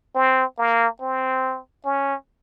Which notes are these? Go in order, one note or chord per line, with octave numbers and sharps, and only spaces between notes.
C4
A#3
C4
C#4